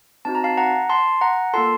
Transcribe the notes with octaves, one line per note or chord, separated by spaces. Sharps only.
C4 D#4 F#4 A5
A#5
F5 A5
F#5 A#5
A5 C6
F#5 A#5
A#3 F4 A4 A5 C6